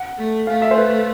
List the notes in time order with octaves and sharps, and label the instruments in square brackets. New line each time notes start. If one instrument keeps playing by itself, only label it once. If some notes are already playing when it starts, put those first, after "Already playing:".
Already playing: [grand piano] F#5
[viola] A3
[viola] A3 [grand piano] F5
[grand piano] E5
C5
B4